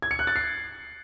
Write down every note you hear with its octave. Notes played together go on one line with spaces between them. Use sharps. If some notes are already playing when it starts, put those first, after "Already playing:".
G#6
C#7
F#6
A6
C7